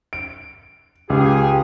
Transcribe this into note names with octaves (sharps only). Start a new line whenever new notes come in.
D7
C#2 G4 G#4 D6